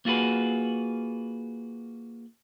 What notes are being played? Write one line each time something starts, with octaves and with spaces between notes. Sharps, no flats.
A#3 F4 F#4 G#4 B4